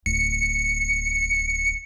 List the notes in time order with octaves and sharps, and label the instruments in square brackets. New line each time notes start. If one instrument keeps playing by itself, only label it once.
[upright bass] D1 [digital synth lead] C#7